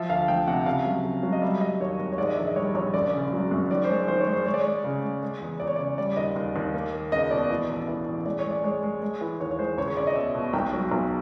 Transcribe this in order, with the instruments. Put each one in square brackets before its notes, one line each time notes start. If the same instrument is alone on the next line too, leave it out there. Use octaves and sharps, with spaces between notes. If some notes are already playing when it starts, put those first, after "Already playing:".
Already playing: [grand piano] F3 E5
D2 F5
F3 G5
C3 F#5
C#3 F5
F#3
C#3
F#3
D#5
G3 E5
G3 D#5
D#2 C#5
D#2
C#5
G#2 D5
D#5
A#1 E5
D#5
G3 C#5
A#1 C#5
F#1 D5
C#3
F#3
F#2
D#3 D5
C5
G#3 C#5
D#3 C5
C#5
G#3
C5
G#3 C#5
D5
G#3 C#5
C#3
G#3
G#3
E2
E2 D5
C#5
C#3 D5
G3 D5
D#2 D#5
D#2 D#5
D#2
A#3
A#3
C#2 D#5
B2 D5
E3
A1
E3
A1
G#3 D5
C#5
G#3
D5
G#3 C#5
G#3
G#3
E3
D#2 C#5
C#5
G#3 C5
C#2 C#5
C#5
C#2 D5
D#5
B2 E5
B2
B1 G5
F#3
B1